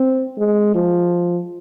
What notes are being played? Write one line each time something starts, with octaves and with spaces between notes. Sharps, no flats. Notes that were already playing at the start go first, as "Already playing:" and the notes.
Already playing: C4
G#3
F3